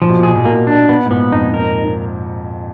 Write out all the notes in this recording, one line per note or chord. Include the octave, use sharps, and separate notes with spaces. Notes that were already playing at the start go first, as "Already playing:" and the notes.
A#2 F3
B2
A#2
B2 G#4
A#2
B2 A#3
A#2
D4
B3
G#2
A#2 B3
F2 D#4
A#4